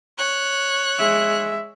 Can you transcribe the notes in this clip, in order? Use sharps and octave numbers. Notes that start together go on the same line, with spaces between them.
C#5 F#6
G#3 E5